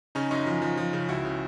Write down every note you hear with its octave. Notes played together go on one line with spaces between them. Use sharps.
C#3 C#4 D#4
F#2 C#4 D#4
F3
F3
F3
C#3
C#2 E4 F#4
C#3